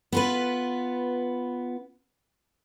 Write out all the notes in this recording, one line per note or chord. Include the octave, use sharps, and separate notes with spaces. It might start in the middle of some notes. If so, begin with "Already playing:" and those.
B3 F4 B4